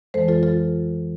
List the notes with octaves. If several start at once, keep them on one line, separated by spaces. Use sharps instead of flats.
F2 E3 G#3 A4 C5
F4 A4
F4 A4